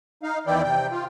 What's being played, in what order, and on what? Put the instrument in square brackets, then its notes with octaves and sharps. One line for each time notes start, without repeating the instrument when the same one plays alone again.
[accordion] D#4 F5
E2 D#3 E3 E4 D5 G5
C3 G5
F4